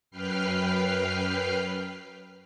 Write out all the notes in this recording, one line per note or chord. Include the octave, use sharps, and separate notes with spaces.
F#2 B4 G5 F6 C7